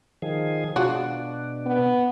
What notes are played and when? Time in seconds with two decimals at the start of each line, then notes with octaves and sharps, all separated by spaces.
0.22 D#3 F3 G#4
0.76 B2 G#3 D4 F4 F#4
1.66 B3